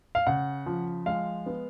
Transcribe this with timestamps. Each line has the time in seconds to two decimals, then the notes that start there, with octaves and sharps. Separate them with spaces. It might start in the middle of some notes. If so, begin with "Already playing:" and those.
0.15 F5
0.27 C#3 F#5
0.66 F3
1.06 G#3 F5
1.46 B3